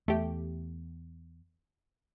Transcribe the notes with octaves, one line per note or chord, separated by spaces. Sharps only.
E2 A3 G4